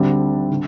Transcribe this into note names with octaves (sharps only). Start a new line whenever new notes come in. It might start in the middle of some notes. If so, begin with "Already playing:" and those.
Already playing: D2 D3 G3 C4
D3